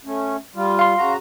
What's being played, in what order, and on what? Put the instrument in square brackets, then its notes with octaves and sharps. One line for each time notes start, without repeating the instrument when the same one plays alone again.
[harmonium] A3 C#4
G3 F4
[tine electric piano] F5 C6
[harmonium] C#3 F#4 A#5